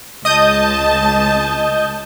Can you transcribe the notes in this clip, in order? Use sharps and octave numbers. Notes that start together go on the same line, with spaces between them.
C#2 D#5 A5 D#6 G6